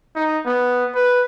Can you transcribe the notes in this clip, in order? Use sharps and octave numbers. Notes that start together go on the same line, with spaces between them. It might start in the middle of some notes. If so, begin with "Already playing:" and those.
D#4
B3
B4